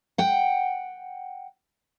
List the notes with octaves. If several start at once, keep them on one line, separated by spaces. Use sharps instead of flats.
F#5 G5